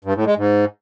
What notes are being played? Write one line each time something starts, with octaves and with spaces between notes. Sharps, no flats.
G2
A2
G#3
G#2